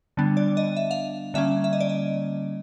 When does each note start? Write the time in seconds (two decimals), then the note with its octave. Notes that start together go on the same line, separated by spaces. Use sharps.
0.17 D3 G3 B3 D4
0.37 D5
0.57 D#5
0.77 E5
0.91 F5
1.34 D3 G3 A#3 C#4 E5
1.64 E5
1.73 D#5
1.80 D5
1.89 D#5